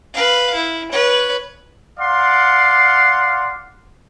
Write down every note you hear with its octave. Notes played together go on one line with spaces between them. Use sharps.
B4 F5
E4
B4 C#5
D5 F5 F#5 C6